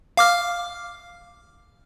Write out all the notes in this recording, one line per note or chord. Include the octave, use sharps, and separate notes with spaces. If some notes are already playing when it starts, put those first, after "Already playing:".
F5 D6 F6